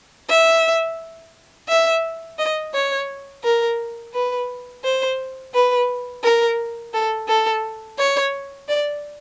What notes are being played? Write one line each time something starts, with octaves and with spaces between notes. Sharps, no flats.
E5
E5
D#5
C#5
A#4
B4
C5
B4
A#4
A4
A4
C#5
D5